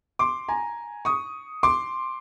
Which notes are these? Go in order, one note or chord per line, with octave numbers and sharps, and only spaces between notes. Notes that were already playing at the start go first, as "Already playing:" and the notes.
C6 D6
G#5 A#5
C#6 D#6
C6 D6